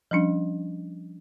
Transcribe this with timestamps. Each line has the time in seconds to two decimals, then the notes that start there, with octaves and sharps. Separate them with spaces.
0.11 F3 G3 C#4 D4